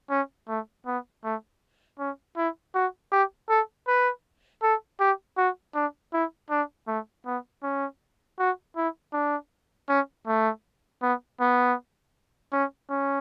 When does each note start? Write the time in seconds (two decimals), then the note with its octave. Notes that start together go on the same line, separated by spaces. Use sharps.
0.10 C#4
0.48 A3
0.86 B3
1.24 A3
1.99 C#4
2.37 E4
2.75 F#4
3.12 G4
3.49 A4
3.87 B4
4.63 A4
5.00 G4
5.37 F#4
5.75 D4
6.13 E4
6.50 D4
6.88 A3
7.26 B3
7.63 C#4
8.39 F#4
8.77 E4
9.13 D4
9.89 C#4
10.27 A3
11.02 B3
11.41 B3
12.53 C#4
12.90 C#4